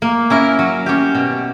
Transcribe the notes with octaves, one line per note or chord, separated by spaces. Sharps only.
A#3
C#4 E4 A#4
F#3
C#4 G4
B2